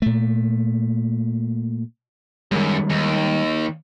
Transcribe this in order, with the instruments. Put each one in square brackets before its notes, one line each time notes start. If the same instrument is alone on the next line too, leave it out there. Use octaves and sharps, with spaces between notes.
[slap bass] A#2 A3
[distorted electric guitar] F#2 [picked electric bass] D#3 G3 G#3
[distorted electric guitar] D#2